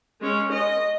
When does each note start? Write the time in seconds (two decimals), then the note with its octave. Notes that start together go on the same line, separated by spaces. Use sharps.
0.21 G#3 C#4
0.52 D#5